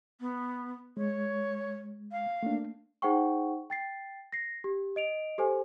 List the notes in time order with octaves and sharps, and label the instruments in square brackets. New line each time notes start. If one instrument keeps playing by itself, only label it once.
[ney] B3
[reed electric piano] G#3 [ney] C#5
[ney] F5
[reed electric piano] A3 A#3 D4
[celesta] D#4 G#4 C5 F#5 G5 C#6
G5 A6 C7
A#6 C7
G4
D#5 D7 F7
G4 A4 C5 G#5